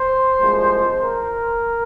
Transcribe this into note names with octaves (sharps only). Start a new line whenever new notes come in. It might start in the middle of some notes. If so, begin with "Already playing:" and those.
Already playing: C5
C2 A#2 F3 G#3
A#4